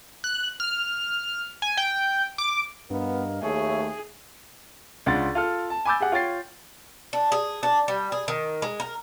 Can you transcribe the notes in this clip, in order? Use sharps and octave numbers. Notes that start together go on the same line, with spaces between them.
F#6
F6
G#5
G5
D6
G2 B3 A#4 D#5 F5
D#2 A3 G#4 C#5 E5
C#2 D4 F4 F#5 C6 A6
F4 A4 F6
A5
G#5 B5 D6 E6 G6 A6
G4 G#4 F#5
F4 C#5 G5 A6 C7
D4
G#4
D4
G3
G#4
D#3
G#3
A#4